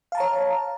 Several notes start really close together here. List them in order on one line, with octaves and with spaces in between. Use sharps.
F5 A5 A#5 C#5